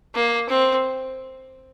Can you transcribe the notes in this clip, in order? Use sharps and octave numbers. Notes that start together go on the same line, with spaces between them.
A#3
C4